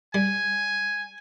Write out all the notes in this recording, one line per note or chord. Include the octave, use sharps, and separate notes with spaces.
G3 G#5